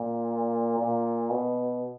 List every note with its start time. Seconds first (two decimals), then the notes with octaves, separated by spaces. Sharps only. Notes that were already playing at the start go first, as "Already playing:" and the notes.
Already playing: A#2
0.79 A#2
1.30 B2